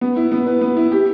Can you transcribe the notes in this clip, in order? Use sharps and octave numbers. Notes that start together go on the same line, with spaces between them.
B3
E4
B3
B4
B3
E4
G4